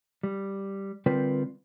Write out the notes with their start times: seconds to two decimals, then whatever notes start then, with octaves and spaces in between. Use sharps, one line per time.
0.23 G3
1.06 D3 G3 C4 F4 A#4 B4